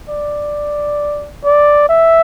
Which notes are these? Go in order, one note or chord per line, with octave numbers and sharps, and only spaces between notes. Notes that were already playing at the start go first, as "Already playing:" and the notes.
D5
D5
E5